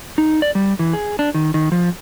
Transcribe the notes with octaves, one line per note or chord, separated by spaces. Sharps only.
D#4
D5
G3
E3
G#4
D4
D#3
D#3
F3